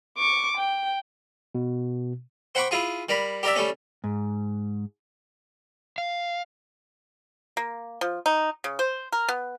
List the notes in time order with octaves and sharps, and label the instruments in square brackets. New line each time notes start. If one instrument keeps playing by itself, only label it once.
[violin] C#6 D6
G5
[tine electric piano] B2
[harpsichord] C5 F#5 G5 B5 C#6 D6
E4 F4 G#4
G3 A#4 B5
G4 A#4 D5 E5
G3 A3 C#4
[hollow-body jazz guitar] G#2
[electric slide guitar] F5
[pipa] A#3
F3
D#4
C#3
C5
A#4
B3